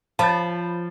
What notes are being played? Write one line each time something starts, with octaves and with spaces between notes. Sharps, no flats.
F3 C#5 A5 B5 A6